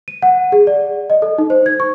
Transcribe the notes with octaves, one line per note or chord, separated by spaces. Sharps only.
D#7
F#5
G#4
D5
D#5
A4
D#4
C5
G#6
C#6